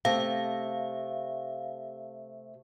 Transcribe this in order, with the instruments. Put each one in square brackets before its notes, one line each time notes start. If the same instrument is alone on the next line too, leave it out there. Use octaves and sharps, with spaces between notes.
[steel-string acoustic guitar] C3 A3 [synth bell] F5